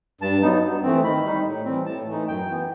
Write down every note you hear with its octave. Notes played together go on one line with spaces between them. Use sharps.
G2 A5
F#3 B3 D#4
G2
E3 A3 C4
D#3 B5
G3 D#4
A2
E3 G3 C4
A2 A5
E3 A3 D#4
F#2 G5
E3 B3